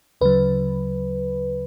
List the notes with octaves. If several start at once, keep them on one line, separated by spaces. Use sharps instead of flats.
D2 C#3 F#3 B4